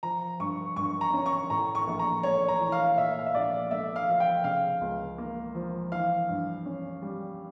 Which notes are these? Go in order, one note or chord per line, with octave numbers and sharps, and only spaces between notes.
F3 A#5
G2 C#6
G2 C#6
A#5
C#4
C#6
A2 A#5
C#6
A#1
A#5
A3 C#5
A#5
E3
F5
A#2 E5
F5
E5
A#1 D5
A3 E5
F5
F3 F5
G5
C#3 F5
C#2
A#3
F3
E3 F5
G2
C#4
G3